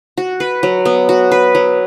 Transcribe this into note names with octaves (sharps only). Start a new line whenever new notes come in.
F#4
B4
F#3
B3
F#4
B4
F#3